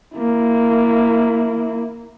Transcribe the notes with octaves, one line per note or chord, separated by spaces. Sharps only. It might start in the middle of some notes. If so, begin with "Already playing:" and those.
A#3 E4